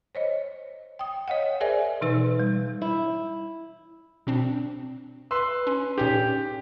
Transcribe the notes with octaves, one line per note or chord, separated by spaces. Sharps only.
C5 C#5 D#5
G5 D#6
C#5 D#5 F5 F#5
G#4 A#4 C5 D5 E5 G#5
B2 E3 D#4 B4 E6
G3
E4
B2 C4 D4
B4 C6 E6
C#4
A#2 C#4 D#4 G4